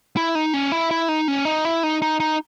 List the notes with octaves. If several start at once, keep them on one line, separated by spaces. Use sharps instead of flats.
E4
D#4
C#4
E4
E4
D#4
C#4
D#4
E4
D#4
D#4
D#4